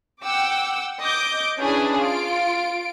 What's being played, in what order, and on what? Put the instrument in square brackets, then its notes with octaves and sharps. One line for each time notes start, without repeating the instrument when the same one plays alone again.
[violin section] F#5 G5 D6 E6
D#5 D6 G6 D7
C#4 D4 E4 G#4 B4
F4 D7